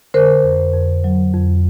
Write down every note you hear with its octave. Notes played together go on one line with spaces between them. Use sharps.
D3 A#4 C5
F2
F2
F#3
F2